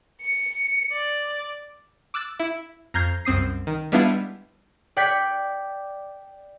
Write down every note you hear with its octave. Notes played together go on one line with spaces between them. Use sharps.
C#7
D5
D6 E6 F#6 A6
E4
F2 A#5 F6 G6 G#6 C7
C2 F#2 C4 D#6 C7
D#3
G3 G#3 B3 D4 E4 F4
D5 G5 F#6 G#6 B6 C#7